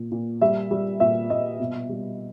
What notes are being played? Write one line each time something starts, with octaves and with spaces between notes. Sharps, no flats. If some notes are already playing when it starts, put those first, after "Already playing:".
Already playing: A#2
A#2
G3 E5
G3
A#2 E5
A#2 D#5
B2
G3